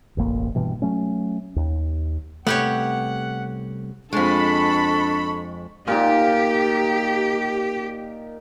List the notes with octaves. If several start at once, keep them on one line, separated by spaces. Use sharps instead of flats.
E1 A1 A#3
G2 B2 E3
F#3 A3 C#4
D#2
C2 A3 B3 G4 C#5 F#5
F2 G#3 D4 A4 B5 C#6
A#2 D#4 G4